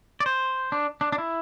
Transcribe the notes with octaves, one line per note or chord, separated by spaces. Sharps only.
D5
C5
D4
D4
D4
E4